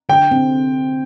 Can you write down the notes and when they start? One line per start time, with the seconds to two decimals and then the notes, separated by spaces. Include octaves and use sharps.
0.09 D3 G5
0.31 C4